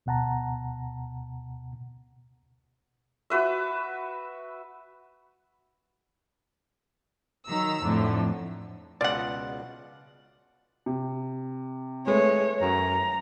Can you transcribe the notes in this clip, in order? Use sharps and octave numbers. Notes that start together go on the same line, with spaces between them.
D2 B2 F#5 A5 A#5
F#4 B4 E5
D#3 F#3 A#5 E6
F2 A2 D3
C#2 B2 F4 D5 F#5
C3
G#3 A3 B4 C#5
F#2 A#5